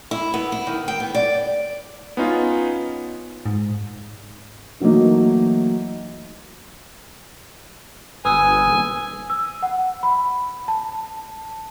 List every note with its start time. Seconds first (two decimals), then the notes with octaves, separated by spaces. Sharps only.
0.11 E4
0.34 B3
0.52 E4
0.67 D#3
0.88 G5
1.00 B3
1.15 D5
2.17 B3 C#4 D#4 F4
3.46 G#2
4.80 E3 F#3 A3 A#3 D#4
8.25 G1 B4 G#5 D#6 E6
8.65 D#1
9.30 E6
9.62 F#5
10.03 B5
10.68 A5